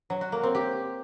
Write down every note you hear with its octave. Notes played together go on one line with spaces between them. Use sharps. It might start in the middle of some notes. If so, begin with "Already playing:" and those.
F#3
F#4
A#3
C4
G4